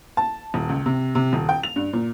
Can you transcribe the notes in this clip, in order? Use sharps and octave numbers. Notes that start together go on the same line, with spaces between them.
A5
D#1
C#2
C3
C3
D#1
G5
F7
G2
A#2